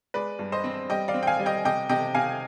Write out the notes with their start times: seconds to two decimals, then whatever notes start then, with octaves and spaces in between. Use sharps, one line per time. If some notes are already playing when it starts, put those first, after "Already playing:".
0.14 G#3 B4 D5
0.39 G2
0.52 C5 D#5
0.64 C4
0.90 G3 D#5 G5
1.08 D5 F5
1.14 C4
1.23 G5
1.27 F5 G#5
1.39 G3
1.46 D#5 G5
1.65 C3 D#5 G5
1.89 C3 D#5 G5
2.15 C3 F5 G#5